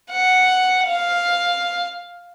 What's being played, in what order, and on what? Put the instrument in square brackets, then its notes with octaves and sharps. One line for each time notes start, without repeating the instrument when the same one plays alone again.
[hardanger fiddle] F#5
F5